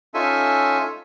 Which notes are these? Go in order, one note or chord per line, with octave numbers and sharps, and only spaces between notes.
C#4 D#4 F4 A4 E5 G#5